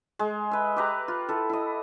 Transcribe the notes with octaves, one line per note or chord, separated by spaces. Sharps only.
G#3
B4 E5
G4 B4 A#5
F4
E4 A4
E4 D#5